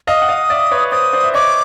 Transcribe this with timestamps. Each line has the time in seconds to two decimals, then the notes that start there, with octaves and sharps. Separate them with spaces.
0.07 D#5 F5 D#6
0.22 F#5
0.29 D#5 F5
0.50 D5 E5
0.71 B4 C#5
0.91 C5 D5 D#6
1.13 C5 D5
1.24 E5
1.34 C#5 D#5 D6